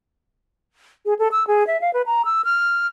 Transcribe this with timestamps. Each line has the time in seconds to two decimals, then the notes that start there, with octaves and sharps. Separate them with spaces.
1.06 G#4
1.19 A4
1.32 E6
1.47 G#4
1.67 E5
1.81 F5
1.94 B4
2.06 A#5
2.25 E6
2.45 F6